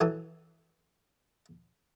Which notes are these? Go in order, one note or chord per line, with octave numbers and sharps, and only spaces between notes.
E3 F#3 A4 D#6